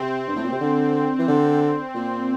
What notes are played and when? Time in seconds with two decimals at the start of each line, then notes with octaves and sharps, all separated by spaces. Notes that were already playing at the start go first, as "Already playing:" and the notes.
Already playing: C3 C4
0.27 G2
0.36 A2
0.44 A#2
0.52 C3
0.60 D3
1.19 E3
1.28 D3
1.94 A#2